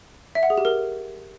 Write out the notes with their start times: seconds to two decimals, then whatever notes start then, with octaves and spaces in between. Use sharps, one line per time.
0.35 E5
0.43 F#5
0.50 G#4
0.58 G4
0.65 A#4